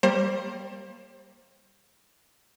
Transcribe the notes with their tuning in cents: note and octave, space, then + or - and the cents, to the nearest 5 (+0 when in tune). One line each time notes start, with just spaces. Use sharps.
G3 +0 A#3 +0 C5 +40